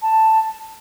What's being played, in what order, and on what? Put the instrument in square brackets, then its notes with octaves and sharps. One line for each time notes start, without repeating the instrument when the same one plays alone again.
[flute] A5